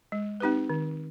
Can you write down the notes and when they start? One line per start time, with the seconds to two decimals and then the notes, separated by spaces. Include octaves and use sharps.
0.12 G#3
0.40 C4 D#4 G4 B4
0.70 D#3